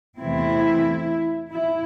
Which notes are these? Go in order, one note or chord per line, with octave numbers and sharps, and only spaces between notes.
E2 C3 E3 A3 C4 E4
E4